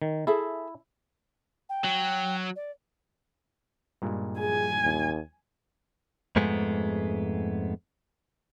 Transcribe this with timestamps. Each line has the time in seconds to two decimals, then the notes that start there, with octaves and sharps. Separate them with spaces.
0.02 D#3
0.27 E4 G#4 A4 E5
1.69 G5
1.84 F#3
2.56 D5
4.02 G2 A#2 G#3
4.40 G#4 G#5
4.83 D#2
6.36 F2 G#2 G#3 A3 B3